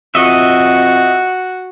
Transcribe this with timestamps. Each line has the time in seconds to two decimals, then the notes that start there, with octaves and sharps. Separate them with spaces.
0.15 F2 F#4 D#5 E5